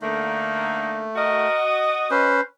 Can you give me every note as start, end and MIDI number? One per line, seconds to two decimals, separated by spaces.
0.02 1.05 50
0.02 1.48 57
0.02 1.05 58
0.02 1.01 63
1.16 2.32 66
1.16 1.60 70
1.16 2.32 75
1.66 2.06 87
2.11 2.41 61
2.11 2.41 71
2.11 2.41 72